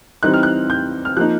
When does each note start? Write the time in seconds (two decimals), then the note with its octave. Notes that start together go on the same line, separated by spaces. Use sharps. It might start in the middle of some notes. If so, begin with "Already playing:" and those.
0.23 E3 G3 C4 D#4 F#6
0.34 F6
0.43 F#6
0.70 G6
1.05 F6
1.17 F3 A#3 D#4 F#6